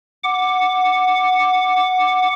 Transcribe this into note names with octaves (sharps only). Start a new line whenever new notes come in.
F#5 D6